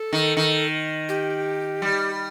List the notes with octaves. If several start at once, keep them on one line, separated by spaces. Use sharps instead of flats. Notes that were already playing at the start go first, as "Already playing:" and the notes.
Already playing: A4
D#3
D#3
G4
G3